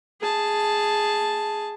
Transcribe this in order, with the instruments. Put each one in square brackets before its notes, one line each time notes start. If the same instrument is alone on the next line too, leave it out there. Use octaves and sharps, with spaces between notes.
[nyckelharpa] G#4 A5